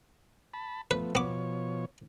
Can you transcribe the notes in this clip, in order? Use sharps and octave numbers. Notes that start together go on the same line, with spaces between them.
A5 B5
F3 A3 B3 B4
B2 F3 B3 C#5 D6